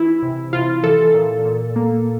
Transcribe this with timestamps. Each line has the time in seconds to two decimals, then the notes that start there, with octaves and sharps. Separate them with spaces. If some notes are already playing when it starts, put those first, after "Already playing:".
Already playing: E3 E4
0.22 C3
0.53 C3 F4
0.83 E3 A4
1.14 A#2
1.45 A#2
1.76 A#3